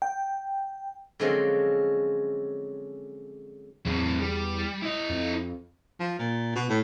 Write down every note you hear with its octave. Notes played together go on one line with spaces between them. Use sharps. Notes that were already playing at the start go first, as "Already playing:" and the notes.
G5
D3 F3 F#3 G#3 C4 C#4
E2 F#3 C4
G3
E4 D#5
F2
F3
A#2
B2
A2